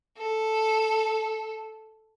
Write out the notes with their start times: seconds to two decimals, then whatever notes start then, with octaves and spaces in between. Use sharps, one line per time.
0.18 A4